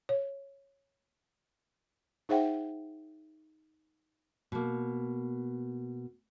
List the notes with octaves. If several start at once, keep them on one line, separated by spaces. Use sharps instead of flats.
C#5
D#4 G#4 C5 E5 F#5 G5
B2 A#3